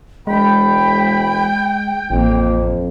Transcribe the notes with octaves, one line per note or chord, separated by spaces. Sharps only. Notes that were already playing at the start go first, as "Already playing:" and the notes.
E1 G#3 G5 B5
A1 F2 A#3